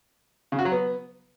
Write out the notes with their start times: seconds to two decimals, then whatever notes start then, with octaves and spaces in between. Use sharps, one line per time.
0.52 C#3
0.59 F#4
0.65 F#3
0.72 B3